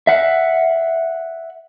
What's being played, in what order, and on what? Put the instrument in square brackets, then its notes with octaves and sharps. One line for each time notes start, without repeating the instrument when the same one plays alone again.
[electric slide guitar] E5 F#5